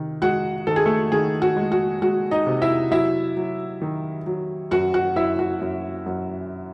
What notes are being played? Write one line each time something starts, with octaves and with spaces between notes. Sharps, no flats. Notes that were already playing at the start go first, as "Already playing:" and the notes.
Already playing: C3 D#3
G#3 F#4 F#5
D#3 A4
G#4
A3 A4
D#3 G#4
F#4
G#3
F#4
G#3 F#4
D#4 D#5
C3
E4 E5
F#3 E4 E5
F#3
D#3
F#3
F#2 F#4 F#5
F#4 F#5
F#2 E4 E5
F#4
F#2
F#2